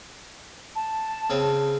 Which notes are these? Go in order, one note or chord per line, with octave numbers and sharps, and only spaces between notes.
A5
C#3 C4